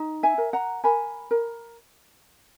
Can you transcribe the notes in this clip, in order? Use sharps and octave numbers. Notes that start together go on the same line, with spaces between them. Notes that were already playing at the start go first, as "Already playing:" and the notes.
Already playing: D#4
E5 G#5
A#4
F#5 A#5
A#4 G#5 B5
A#4